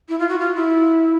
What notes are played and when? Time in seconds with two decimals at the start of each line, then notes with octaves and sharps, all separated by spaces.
0.09 E4
0.19 F4
0.29 F#4
0.39 F4
0.55 E4